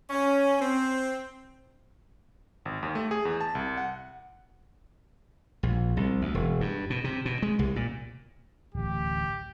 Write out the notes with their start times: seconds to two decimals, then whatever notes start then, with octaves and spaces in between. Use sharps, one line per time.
0.10 C#4
0.60 C4
2.65 G#1
2.83 D#2
2.95 A3
3.11 G#4
3.25 E2
3.41 A5
3.55 C2
3.77 F#5
5.63 A#1
5.97 C2
6.21 D2
6.34 E1
6.61 G2
6.90 B2
7.04 C3
7.25 B2
7.42 G#3
7.59 C2
7.76 A#2
8.75 D1 A1 G4